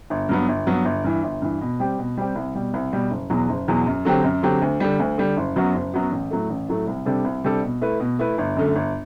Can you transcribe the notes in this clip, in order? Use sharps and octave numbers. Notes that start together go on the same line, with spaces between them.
G1
G2 F#3 B3
G1
G2 F#3 B3
G1
G2 E3
G1
G2 E3
B2
G3 C4 G4
B2
G3 C4 G4
C2
B2 G3
C2
B2 G3
F#1
E2 B2 F#3
F#1
E2 B2 F#3
F#2
D3 F#3 C4 G4
F#2
D3 F#3 C4 G4
D2
D3 G3
D2
D3 G3
F#1
F#2 F#3 B3 F#4
F#1
F#2 F#3 B3 F#4
A1
A2 F#3 A3
A1
A2 F#3 A3
C2
C3 G3 D4 A4
C2
C3 G3 D4 A4
B2
A3 E4 B4
B2
A3 E4 B4
G1
F#2 D3 A3
G1